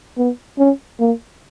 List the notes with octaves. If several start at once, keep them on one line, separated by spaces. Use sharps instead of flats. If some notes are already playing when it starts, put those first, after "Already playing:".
B3
C#4
A#3